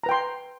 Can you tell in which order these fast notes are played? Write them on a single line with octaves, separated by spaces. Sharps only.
A#5 B4 G5 C6